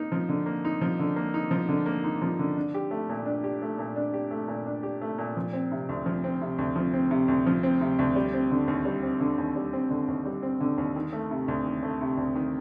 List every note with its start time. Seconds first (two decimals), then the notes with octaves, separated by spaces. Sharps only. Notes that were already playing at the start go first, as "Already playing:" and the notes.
Already playing: A#3 D#4
0.12 F3
0.29 D3
0.46 A#3
0.65 D#4
0.81 F3
0.99 D3
1.16 A#3
1.34 D#4
1.51 F3
1.69 D3
1.86 A#3
2.04 D#4
2.22 F3
2.39 D3
2.57 D4
2.74 G4
2.91 A3
3.09 A#2
3.26 D4
3.44 G4
3.62 A3
3.79 A#2
3.96 D4
4.14 G4
4.31 A3
4.48 A#2
4.66 D4
4.83 G4
5.01 A3
5.18 A#2
5.37 F3
5.53 C4
5.72 C3
5.89 D2
6.06 F3
6.24 C4
6.41 C3
6.58 D2
6.76 F3
6.94 C4
7.11 C3
7.28 D2
7.46 F3
7.63 C4
7.81 C3
7.99 D2
8.16 G3
8.34 C4
8.51 D3
8.68 D#2
8.85 G3
9.03 C4
9.20 D3
9.38 D#2
9.56 G3
9.73 C4
9.91 D3
10.08 D#2
10.25 G3
10.43 C4
10.61 D3
10.78 D#2
10.96 D#3
11.13 A3
11.31 C3
11.48 D2
11.66 D#3
11.83 A3
12.01 C3
12.17 D2
12.35 D#3